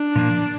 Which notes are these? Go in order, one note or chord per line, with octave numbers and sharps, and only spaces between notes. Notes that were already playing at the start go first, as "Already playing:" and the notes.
Already playing: D4
A#2 F3 A#3